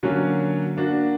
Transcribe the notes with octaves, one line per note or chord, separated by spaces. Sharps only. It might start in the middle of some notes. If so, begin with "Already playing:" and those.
D3 F#3 A#3 C#4
A#3 D4 F#4